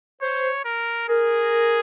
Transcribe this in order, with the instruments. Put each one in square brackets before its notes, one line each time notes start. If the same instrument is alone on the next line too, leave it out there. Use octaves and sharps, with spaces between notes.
[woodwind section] C5 [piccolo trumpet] C#5
[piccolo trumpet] A#4
[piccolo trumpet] G#4 [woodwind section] A#4